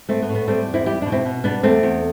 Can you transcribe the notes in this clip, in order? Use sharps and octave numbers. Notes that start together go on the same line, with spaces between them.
A2 A3 C4
B3
A2
B3
G3 A3 C4
E2
C4 E4
G3 E4 G4
B2 D4
C4 E4
B2
G3 B3 D4
E2 A3 C4
E2